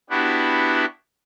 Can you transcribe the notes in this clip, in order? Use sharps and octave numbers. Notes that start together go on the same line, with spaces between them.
B3 D4 E4 F#4 G4